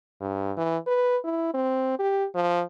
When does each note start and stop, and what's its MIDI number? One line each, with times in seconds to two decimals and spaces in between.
0.21 0.52 43
0.57 0.78 52
0.87 1.17 71
1.24 1.49 64
1.54 1.98 60
1.99 2.26 67
2.35 2.63 53